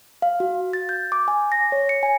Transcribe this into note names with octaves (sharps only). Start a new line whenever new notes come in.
F5
F#4
A6
G6
D6
G#5
A#6
C#5
C#7
G#5